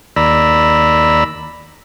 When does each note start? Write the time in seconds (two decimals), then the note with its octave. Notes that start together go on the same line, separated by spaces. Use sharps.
0.16 D#2 D5 A#5 B5 E6